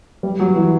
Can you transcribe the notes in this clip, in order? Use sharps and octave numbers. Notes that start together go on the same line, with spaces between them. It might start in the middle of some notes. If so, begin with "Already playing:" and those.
G3
F#3
E3